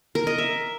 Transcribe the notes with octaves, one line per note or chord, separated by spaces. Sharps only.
A#4
D#5
E5